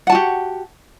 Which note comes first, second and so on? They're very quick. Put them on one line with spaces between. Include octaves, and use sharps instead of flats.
F#5 A5 F#4 G4